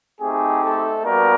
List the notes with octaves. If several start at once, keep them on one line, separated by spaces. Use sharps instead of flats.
A3 C4 D#4 G4 G#4
A3 A4
G3 A#3 B3 D4 F#4 A#4